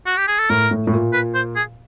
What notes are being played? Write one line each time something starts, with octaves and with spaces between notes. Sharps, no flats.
F#4
G4
G#4
A4
A2 A#4
A2
A2
A#2
B4
C5
G#4